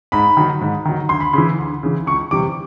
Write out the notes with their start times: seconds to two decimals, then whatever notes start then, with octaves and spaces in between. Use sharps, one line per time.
0.12 G#2 B5
0.37 D#3 F#3
0.61 G#2
0.85 D#3 F#3
1.09 D2 C6
1.20 B5
1.33 C#3 E3 C6
1.58 D2
1.83 C#3 E3
2.06 C#2 C#6
2.31 C3 E3 G3 D6